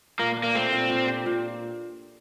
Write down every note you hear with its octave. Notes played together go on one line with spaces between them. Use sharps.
A#2 A#3
D4
A#3
A3 C4
A#2
A#2
G4
A#2